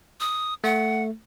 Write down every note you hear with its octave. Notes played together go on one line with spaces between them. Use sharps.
D#6
A3 F#5